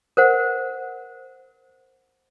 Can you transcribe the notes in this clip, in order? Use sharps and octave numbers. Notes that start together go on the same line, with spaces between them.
A#4 C5 F#5